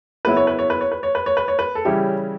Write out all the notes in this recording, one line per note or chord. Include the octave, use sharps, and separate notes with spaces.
C#3 F#3 B3 E4 B4
C#5
B4
C#5
B4
C#5
B4
C#5
B4
C#5
B4
C#5
B4
A4
C#3 E3 G3 C#4 E4 G4